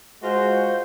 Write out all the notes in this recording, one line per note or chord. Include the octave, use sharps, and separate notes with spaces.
G#3 F4 F#4 C5